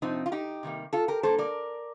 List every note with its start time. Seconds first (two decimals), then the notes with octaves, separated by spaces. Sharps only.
0.02 F2 C3 F3 C4 D#4
0.26 F4
0.32 D#4 G4
0.63 C3 D#3 G3 A#3
0.93 F4 A4
1.08 G4 A#4
1.23 A#2 G3 A#3 A4 C5
1.38 A#4 D5